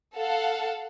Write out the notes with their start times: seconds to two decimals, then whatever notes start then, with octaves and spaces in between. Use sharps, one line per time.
0.15 A4 F5 F#5